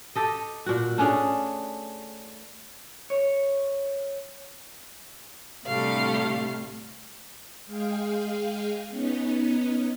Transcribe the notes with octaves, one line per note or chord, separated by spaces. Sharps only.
G4 A4 D#5
A#2 F#4
A3 C#4 D4 G#4
C#5
D2 A2 C3 G3 A3 F5
G#3 G#4 F5 G5
B3 C#4 D#4